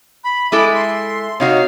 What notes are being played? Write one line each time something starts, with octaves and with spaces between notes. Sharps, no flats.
B5
G#3 E4 A4 E5 D6
C6
C3 D#4 F#4 C#5 F5